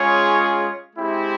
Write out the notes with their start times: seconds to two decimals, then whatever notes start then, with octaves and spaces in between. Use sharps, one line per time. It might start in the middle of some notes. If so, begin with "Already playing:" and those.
Already playing: G#3 C#4 F4 G#4 C#5
0.95 G#3 C4 E4 G4